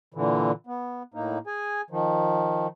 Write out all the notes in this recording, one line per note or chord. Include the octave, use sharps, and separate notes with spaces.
A#2 D3 E3
B3
A2 A#3 D#4
G#4 G#5
D#3 F3